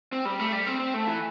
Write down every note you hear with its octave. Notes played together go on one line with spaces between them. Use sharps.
C4
G3
A3
G3
C4
C4
A3
E3